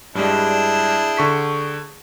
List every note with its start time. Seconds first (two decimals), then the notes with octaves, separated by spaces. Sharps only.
0.15 G2 G3 G#3 D4 E4 G#4 G5
1.17 D3 C#6 B6